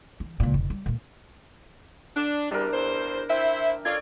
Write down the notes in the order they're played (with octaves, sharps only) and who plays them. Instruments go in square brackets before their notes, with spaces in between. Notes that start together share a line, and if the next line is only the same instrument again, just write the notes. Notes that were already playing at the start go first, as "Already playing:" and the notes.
[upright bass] E3
C#2 A#2
F1
G3
A#2 A3
[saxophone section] D4
[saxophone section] E2 C3 G3 [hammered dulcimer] D4 A#4
[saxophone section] E2 C5
[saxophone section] E4 C5 [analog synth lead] E5 [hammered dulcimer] G5
[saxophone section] F4 [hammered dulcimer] A4 C#5 D5 [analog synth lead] G#6